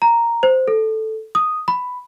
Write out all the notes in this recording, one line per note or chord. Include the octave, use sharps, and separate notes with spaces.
A#5
C5
A4
D#6
B5